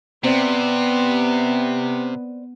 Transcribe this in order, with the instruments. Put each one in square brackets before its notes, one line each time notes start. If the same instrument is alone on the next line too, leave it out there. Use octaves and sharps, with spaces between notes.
[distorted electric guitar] C3 [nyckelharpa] B3 [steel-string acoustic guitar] C4 D5